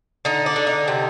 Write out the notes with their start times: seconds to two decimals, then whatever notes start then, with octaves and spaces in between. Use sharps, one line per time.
0.25 D3 D#4
0.46 D4
0.56 D3
0.67 D#4
0.88 C3